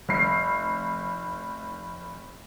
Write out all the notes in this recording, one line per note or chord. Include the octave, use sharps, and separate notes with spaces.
F1 C7